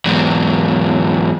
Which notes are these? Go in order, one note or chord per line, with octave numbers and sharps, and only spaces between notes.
E2 G#2